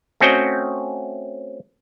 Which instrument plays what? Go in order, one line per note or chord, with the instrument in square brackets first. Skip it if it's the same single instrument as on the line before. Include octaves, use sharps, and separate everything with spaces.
[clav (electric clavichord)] A3 C4 C#4 F#4 D#5 G5